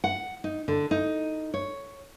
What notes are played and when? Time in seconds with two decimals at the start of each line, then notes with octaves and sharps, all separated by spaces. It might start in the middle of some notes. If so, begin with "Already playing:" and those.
0.04 F#5
0.44 D#4
0.68 D3
0.91 D#4
1.54 C#5